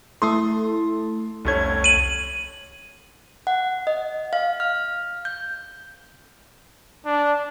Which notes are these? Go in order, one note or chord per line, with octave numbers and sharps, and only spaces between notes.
A3 E4 A4 C6 D#6 C7
F1 C2 A3 C#4 G#6
D#7 F#7
F#5
D#5
F5
F6
G6
D4